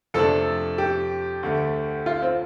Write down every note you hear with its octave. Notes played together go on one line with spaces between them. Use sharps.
F2 C3 F3 A3 D4 A4
G4
D2 D3 A3
F4
C4